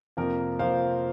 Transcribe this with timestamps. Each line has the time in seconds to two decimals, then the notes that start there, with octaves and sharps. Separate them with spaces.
0.17 F2 C3 F3 A#3 A#4
0.59 F2 C3 F3 A#3 C5 F5